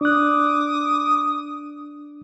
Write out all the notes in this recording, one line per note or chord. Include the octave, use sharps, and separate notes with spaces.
D4 D6 D#6 F#6